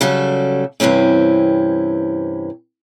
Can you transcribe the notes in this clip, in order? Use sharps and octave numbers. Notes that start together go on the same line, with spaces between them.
C#3 F#3 G3 A4
G2 C3 E3 C4 C#4